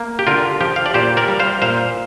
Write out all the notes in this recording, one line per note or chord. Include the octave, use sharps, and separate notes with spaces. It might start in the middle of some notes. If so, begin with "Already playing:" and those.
Already playing: A#3
G4
D3 F4 A#4
F3 G4
F5
D5
A#2 G4 C5
A#4 D5
G3
C5 F5
A#2 C5 F5